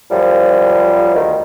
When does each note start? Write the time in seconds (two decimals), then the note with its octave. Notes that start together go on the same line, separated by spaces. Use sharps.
0.10 F#2 F3 G3
1.14 D2 D#3